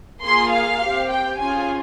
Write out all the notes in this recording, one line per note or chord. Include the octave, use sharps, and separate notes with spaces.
A#3 F4 G#4 C6
F5
C4 G4
G5
C#4 F4 G#4 G#5